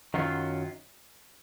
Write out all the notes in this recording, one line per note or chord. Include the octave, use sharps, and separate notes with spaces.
F#2 D#3 F#3 C#4 F4